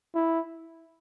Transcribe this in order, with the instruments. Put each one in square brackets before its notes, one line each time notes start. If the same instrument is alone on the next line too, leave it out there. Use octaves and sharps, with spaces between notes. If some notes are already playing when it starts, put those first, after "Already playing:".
[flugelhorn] E4